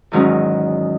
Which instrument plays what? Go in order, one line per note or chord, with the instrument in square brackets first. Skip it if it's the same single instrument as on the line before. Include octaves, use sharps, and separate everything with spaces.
[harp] E2 G#2 D#3 F#3 G#3 C#4